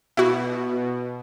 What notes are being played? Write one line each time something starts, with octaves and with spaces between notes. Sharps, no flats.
B2 E4 F#4